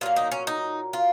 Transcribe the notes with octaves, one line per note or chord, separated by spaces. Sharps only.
A#2 F#3 A#3 F4
D#4
C#4
D#4
F4